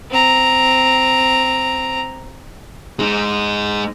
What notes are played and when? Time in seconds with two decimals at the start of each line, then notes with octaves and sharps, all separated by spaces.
0.11 C4 A#5
2.99 G#3 D#4